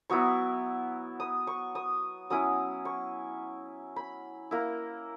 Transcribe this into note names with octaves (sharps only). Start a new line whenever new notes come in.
F#3 B3 E4 C#6
D#6
C#6
D#6
F#3 C#4 E4 D#6
C#6
B5
A#3 E4